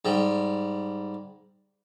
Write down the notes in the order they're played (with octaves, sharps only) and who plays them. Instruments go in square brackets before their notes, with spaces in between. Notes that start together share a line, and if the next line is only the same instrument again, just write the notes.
[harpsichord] G#2 G3